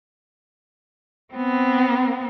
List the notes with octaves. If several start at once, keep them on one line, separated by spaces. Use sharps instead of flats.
B3 C4